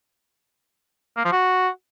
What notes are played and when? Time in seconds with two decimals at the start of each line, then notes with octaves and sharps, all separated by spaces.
1.17 A#3
1.25 F3
1.32 F#4